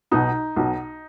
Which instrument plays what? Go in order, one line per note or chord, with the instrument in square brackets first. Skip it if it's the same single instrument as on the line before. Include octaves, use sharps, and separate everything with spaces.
[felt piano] B1 B2 D#4
B1 B2